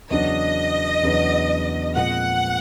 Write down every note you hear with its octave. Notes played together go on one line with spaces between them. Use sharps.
E2 C#3 F#3 B3 D4 D#5
E2 C#3 F#3 B3 D4
A#2 F3 G#3 C4 F#5